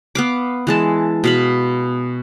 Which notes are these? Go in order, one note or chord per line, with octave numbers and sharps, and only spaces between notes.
B3 F5 D6
E3 G#3 A5
B2 F5 B5